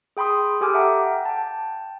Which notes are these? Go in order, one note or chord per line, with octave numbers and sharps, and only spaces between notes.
G#4 G5 B5 C6 D#6
G4 A4 G5 G#5 D6 F6
E5 F#5 G5 A#5
G5 A5